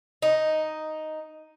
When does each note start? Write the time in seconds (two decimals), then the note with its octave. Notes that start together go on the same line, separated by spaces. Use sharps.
0.22 D#4